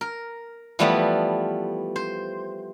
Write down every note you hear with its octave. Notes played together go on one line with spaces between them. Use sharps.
A#4
E3 F3 G3 A3 B3
C5